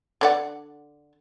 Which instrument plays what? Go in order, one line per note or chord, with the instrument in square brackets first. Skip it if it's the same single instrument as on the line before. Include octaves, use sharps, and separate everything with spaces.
[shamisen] D3 D5 F#5